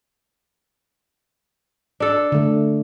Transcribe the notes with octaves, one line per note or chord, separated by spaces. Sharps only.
D4 A4
D3 A3